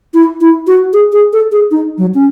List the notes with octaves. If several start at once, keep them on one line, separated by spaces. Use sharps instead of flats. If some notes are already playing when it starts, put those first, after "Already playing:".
E4
E4
F#4
G#4
G#4
A4
G#4
D#4
F#3
C#4